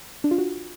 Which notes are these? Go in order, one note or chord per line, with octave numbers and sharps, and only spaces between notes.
D4
F4
F#4